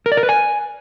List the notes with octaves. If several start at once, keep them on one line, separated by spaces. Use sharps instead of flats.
A#4
D5
A#4
B4
G#5